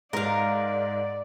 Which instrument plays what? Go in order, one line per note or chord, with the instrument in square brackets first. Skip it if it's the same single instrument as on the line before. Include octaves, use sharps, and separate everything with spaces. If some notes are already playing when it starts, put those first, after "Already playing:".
[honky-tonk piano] G#2 [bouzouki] A#4 F5 [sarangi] D5